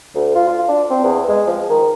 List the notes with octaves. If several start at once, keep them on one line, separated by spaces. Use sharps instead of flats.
D2
F4
F4
D4
C4
E2
G#3
F3
D#3